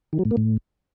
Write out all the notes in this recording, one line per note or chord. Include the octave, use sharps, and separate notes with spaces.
D#3
F#3
A2
A#3
A2